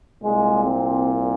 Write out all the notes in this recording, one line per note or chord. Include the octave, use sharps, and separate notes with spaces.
C2 A#2 G#3
C4